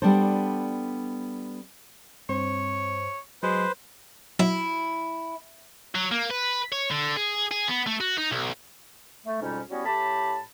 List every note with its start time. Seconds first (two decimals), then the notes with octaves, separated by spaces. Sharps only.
0.02 G3 B3 D4 A4 C5
2.29 G2 C4 C5 C#5
3.43 F#3 G#3 B4 C5
4.39 F#3 E4
5.95 F#3
6.12 A#3
6.31 B4
6.73 C#5
6.91 D3
7.16 G#4
7.52 G#4
7.68 B3
7.87 A3
8.01 F#4
8.18 D#4
8.31 B1
9.25 A3
9.41 F2 G#2 B2 G3 C#4 D#4
9.69 F#3 G3 B3 C#4 E4 F#4
9.85 A2 G4 A5 B5